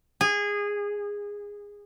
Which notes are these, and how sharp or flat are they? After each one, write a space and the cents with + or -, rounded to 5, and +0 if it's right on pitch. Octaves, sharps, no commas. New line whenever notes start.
G#4 -20